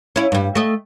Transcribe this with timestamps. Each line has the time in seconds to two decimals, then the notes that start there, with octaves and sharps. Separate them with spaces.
0.16 C#4 E4
0.32 G2 G3
0.55 A3 D#5